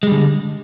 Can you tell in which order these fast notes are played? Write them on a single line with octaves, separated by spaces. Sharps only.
G#3 G3 D3